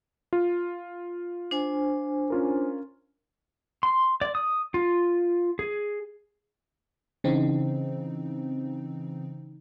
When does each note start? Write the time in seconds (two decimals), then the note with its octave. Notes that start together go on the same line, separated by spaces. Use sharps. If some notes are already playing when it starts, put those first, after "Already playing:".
0.33 F4
1.51 D4 C5 G#5
2.30 C#4 F4 A#4
3.83 C6
4.21 D5
4.35 D#6
4.74 F4
5.59 G#4
7.24 C#3 E3 C4 D#4